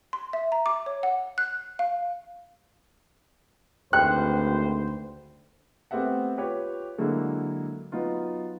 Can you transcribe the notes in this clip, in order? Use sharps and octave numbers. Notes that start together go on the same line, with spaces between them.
C6
E5
A#5
D6
C#5
F#5
F#6
F5
G#1 D2 B4 C5 G5 F#6
A3 B3 C4 G4 E5 F#5
F4 G4 B4 C#5
D3 F#3 G#3 A#3 E4
F#3 B3 D#4 F4